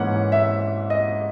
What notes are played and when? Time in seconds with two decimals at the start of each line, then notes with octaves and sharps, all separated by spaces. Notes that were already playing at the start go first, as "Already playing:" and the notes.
Already playing: G#2 E3 A#3 C#4 F#5
0.32 E5
0.90 D#5